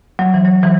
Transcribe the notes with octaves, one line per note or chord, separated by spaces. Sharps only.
F#3
E3
F#3
E3